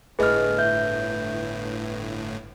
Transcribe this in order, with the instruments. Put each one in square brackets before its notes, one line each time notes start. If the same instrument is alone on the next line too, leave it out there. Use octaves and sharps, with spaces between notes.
[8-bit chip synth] G1 A2 [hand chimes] G#4 D#5 F6 [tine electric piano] B4
[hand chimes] E5 G6